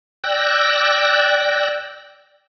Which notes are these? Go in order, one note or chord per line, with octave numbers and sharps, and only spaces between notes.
D5 G5 E6 F#6 A#6